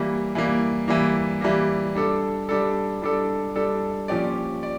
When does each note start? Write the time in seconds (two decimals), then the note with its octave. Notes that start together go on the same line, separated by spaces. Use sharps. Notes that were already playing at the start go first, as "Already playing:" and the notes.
Already playing: E3 G3 A#3
0.35 E3 G3 A#3
0.88 E3 G3 A#3
1.41 E3 G3 A#3
1.95 G3 D4 A4
2.49 G3 D4 A4
3.02 G3 D4 A4
3.56 G3 D4 A4
4.08 A#2 F3 C#4 G4 D5
4.63 D5